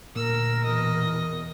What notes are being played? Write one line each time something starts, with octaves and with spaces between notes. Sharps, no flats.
D2 A#2 A#4 E6
E2 B2 E3 D#5